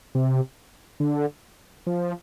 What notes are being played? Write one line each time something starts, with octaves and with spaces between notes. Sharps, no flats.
C3
D3
F3